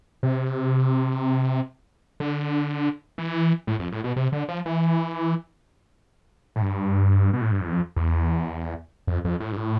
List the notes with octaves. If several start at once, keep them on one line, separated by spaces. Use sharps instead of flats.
C3
D3
E3
A2
F2
A2
B2
C3
D3
F3
E3
A2
G2
B2
A2
G2
F2
E2
F2
E2
F2
F2
A2
G2
A2